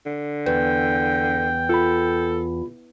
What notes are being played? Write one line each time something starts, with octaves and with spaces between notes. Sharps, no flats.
D3
E2 B4 G5
F4 A4 B5